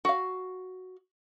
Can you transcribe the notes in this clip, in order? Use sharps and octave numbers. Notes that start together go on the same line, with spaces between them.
F#4 F5